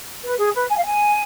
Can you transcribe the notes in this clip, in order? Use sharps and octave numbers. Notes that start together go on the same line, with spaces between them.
B4
G#4
B4
G#5
F5
G#5